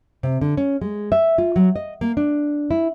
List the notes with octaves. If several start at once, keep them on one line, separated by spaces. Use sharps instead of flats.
C3
D3
C#4
G#3
E5
F4
F#3
D#5
A#3
D4
E4